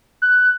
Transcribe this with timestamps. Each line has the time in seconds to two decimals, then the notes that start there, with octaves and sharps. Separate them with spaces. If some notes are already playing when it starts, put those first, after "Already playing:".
0.22 F#6